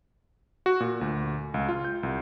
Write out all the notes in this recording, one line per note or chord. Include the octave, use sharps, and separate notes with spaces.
F#4
A#2
D2
C#2
F4
G6
C2